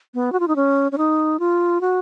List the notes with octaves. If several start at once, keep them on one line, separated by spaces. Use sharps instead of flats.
B3
F#4
F4
D#4
C#4
C#4
D#4
F4
F#4